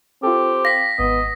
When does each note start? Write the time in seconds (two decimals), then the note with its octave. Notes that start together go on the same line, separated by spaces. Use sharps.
0.23 C4 F4 G4 A4
0.65 F5 A#6 B6
0.99 G#1 B3 D#5